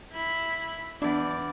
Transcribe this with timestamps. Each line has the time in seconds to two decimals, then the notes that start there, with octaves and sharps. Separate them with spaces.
0.12 E4 B5
1.02 E2 D4 E4 D5